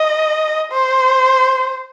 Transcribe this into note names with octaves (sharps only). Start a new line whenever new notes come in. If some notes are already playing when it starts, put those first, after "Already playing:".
Already playing: D#5
C5